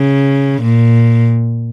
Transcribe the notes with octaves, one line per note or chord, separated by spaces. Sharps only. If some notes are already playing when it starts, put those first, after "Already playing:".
Already playing: C#3
A#2